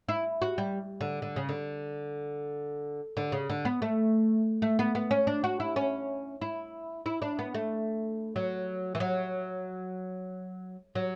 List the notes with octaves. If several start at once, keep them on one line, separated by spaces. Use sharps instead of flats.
E4
F#4
G3
D3
D3
C#3
D3
D3
C#3
D3
B3
A3
A3
B3
B3
C#4
D4
F#4
E4
C#4
E4
E4
D4
B3
A3
F#3
E3
F#3
F#3